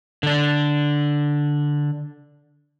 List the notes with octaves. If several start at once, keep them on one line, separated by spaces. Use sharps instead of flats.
D3 D4